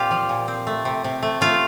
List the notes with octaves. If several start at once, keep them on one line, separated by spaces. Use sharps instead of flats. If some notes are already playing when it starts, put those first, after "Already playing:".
Already playing: A#2 C4 F4 G4
F3
A#2
C4
A3
C3
C3
A3
A3 F4